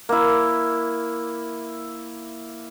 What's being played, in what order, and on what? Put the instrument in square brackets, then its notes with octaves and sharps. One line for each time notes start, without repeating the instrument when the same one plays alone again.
[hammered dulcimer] A#3 E4